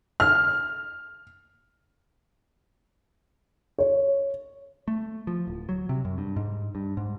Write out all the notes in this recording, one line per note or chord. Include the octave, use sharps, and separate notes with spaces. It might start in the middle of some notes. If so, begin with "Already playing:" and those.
F6
C#5
A3
F3
D1
F#3
C3
F#2
G2
G#2
G2
G#2